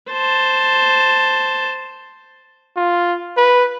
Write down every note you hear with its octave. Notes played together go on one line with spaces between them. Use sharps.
C5 A5
F4
B4